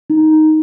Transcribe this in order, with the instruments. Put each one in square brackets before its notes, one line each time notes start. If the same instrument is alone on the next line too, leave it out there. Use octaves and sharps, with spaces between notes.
[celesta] D#4